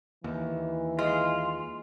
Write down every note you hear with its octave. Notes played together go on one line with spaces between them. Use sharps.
D#2 E3
G#3 F4